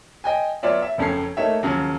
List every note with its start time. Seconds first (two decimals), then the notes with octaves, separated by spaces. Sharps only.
0.24 D#5 G5 G#5
0.63 F#3 B3 F4 C#5 D5 E5
0.82 E5
0.98 F#1 F2 C#4 A4 C7
1.37 A3 A#3 D#4 C#5 E5
1.63 D#2 C#3 F3 F#3